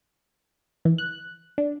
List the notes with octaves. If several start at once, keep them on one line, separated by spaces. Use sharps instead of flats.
E3
F#6
D4